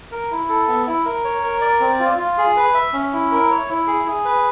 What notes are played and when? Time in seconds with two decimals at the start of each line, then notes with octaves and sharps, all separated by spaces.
0.12 A#4
0.31 E4
0.49 A4
0.68 B3
0.87 E4
1.05 A#4
1.24 C#5
1.43 A#4
1.61 D5
1.80 C4
2.00 F4
2.18 F4
2.38 G#4
2.57 B4
2.74 E5
2.93 C#4
3.13 E4
3.32 A#4
3.50 C#5
3.69 E4
3.87 G#4
4.07 G#4
4.25 B4